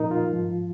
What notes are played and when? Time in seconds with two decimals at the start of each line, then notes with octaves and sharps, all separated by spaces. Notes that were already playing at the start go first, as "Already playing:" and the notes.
Already playing: A#2 F3 D#4 A#4
0.11 F4
0.31 G#2 F3